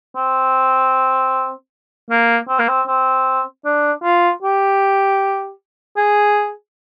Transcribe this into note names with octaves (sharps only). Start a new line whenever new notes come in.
C4
A#3
C4
A#3
C4
C4
D4
F4
G4
G#4